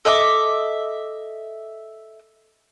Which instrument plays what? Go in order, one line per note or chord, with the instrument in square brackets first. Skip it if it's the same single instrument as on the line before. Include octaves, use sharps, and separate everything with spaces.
[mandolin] A4 D#5 E5 D6